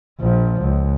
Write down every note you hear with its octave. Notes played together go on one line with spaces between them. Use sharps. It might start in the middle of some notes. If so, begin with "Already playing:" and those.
A#1 F3
C#2